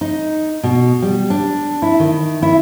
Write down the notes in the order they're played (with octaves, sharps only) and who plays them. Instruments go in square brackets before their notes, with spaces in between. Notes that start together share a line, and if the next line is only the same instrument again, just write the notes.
[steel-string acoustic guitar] D#4
B2
G3
D4
E4
D#3
E4